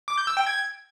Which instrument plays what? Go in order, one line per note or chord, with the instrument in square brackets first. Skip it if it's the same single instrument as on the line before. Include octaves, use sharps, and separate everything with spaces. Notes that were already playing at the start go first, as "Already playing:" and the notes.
[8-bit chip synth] D6
G6
E6
G5
G#6